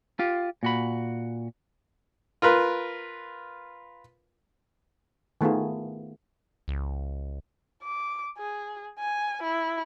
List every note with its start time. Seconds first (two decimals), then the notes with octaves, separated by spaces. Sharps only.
0.19 F4 G4
0.63 A#2 F#4 B5
2.42 F4 A#4 B4
5.41 D#3 A3 B3 F4 G#4
6.68 C#2
7.83 D6
8.38 G#4
8.99 G#5
9.43 E4